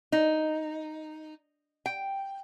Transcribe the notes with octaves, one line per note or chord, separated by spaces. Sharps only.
D#4
G5